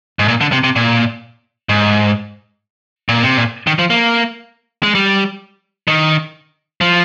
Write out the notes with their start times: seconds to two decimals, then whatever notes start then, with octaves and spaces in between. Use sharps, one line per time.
0.19 G#2
0.28 A#2
0.41 D3
0.52 C3
0.64 C3
0.76 A#2
1.69 G#2
3.09 A#2
3.23 C3
3.37 A#2
3.67 D#3
3.79 F3
3.90 A#3
4.83 G#3
4.95 G3
5.88 D#3
6.81 F3